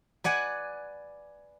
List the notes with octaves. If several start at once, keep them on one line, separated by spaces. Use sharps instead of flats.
B4 D5 F#5 G#5